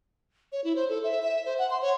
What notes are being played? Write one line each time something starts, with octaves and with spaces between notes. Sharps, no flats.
C#5
E4
C5
A4
E5
E5
C5
F#5
C6
C#5